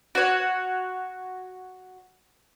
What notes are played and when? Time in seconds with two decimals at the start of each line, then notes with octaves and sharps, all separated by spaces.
0.15 F#4 C#5